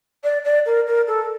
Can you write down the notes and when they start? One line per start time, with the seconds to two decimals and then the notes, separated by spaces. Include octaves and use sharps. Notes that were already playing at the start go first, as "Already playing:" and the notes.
0.23 D5
0.44 D5
0.65 A#4
0.86 A#4
1.07 A4